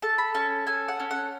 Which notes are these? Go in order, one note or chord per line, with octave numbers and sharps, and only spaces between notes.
A4 A5
B5
C#4 A5
A4 G#5
F#5
C#4
F#5